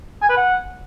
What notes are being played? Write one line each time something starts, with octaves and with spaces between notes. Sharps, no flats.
G#5
B4
F#5